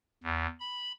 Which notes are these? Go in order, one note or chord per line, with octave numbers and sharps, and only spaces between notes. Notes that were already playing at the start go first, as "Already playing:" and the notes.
E2
B5